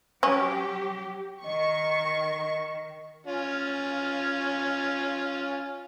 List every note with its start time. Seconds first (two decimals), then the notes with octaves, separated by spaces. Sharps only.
0.23 F#3 C#4 G4
1.44 D#3 D#5 C#6
3.27 C#4 F4